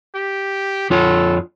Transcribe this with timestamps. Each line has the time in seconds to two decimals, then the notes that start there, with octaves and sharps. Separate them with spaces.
0.15 G4
0.90 F2 F4 A4 C#5